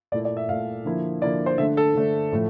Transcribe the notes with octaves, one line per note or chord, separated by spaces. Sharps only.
A#2 A3 E4 D5
D5
E5
A#2 A3 E4 F5
D3 F3 A#3 E4
D3 F3 A#3 E4 D5
C5
D3 A3 D4 E5
A4
D3 A3 D4
A2 F3 A3